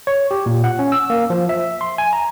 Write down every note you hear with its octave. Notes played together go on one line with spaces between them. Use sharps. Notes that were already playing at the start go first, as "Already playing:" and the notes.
C#5
G4
A#2
F#5
C#4
E6
A#3
F3
E5
C6
G#5
A#5